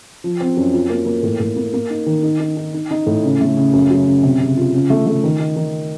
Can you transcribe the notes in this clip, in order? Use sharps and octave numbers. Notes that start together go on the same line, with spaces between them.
F3
C4
F#2
F4
A#3
A#3
A2
A2
A#3
A#3
D#4
D#3
D#4
D#4
D#4
D#4
D#4
A2
C#3
A3
C#3
F#2
F#3
C#3
C3
C3
F4
C#3
A3
A3
D#3
D#4
D#3